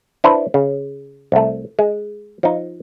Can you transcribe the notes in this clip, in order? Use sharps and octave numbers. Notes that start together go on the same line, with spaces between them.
D4 E4 B4 C5
C#3
C2 A3
G#3
F3 D#4